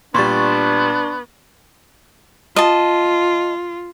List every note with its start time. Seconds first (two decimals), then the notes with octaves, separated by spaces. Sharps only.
0.14 A#2 G3 B3 D4 C6 C#6 A6
2.56 F4 D#5 A5